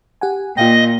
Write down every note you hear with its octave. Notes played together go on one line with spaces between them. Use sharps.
G4 F#5 G#5
A#2 F4 D#5 F5 G5